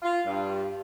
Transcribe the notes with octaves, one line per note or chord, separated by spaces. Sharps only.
F4
G2